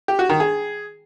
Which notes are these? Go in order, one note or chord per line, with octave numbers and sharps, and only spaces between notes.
G4
F#4
D#3
G#4